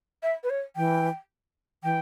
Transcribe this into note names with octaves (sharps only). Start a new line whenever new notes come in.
E5
B4
C#5
E3 G5
E3 G5